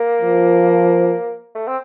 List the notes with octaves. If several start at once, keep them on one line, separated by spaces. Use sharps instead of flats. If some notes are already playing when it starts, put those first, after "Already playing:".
Already playing: A#3
F3
A3
C4